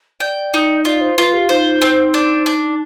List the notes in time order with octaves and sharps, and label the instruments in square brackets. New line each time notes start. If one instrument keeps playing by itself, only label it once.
[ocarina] D5 [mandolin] G5
[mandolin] D#4
[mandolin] F4 [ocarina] D5
[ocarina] C5
[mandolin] F4 [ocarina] B4
[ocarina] G4
[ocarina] D#4 [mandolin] C5
[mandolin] C4
D4
D4